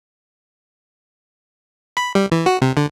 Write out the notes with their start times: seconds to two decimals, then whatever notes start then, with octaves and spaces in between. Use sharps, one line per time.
1.97 B5
2.15 G3
2.32 E3
2.46 F#4
2.62 C3
2.77 D3